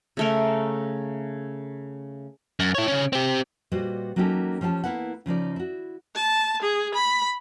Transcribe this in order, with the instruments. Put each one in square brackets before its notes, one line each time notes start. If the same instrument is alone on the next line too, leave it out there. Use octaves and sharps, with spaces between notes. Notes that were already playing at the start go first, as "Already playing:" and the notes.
[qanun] C#3 A3 A#4
[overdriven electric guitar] F#2
E4 C#5
C#3 C#4
C4 G4
[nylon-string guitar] A#2 G3 F#4 B4 C5 D#5
F#3 A#3 C#4 D#4 G4 A4
F3 C#4 G4 F5 A5
A#3 B3 E4 B4 F#5
C#3 F3 D#4 D5
E4 F#4
[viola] A5
G#4
B5